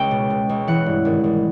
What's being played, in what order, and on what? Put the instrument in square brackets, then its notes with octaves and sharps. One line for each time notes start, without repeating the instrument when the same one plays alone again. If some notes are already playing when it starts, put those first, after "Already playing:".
Already playing: [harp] C#2 G5
B2
B2
C#2
E3 F#5
G2
G#1
G#1